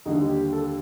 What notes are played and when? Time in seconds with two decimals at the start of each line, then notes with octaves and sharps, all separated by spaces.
0.05 D#2 D3 G3 D#4
0.29 G4
0.53 A4